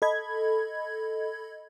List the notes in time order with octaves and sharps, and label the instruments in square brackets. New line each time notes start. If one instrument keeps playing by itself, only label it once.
[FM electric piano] A4 D#5 B5 G#6